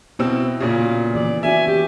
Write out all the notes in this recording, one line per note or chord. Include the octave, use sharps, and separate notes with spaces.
B2 C4 E4 E6
A#2 C#3 F4
A#3 B3 F#4
D#3 E3 G#4 D5
C#4 F#4 G#4 E5 G#5
E3 G4